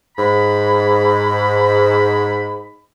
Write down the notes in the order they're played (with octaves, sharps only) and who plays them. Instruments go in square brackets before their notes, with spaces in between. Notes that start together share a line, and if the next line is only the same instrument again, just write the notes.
[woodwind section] G#2 B5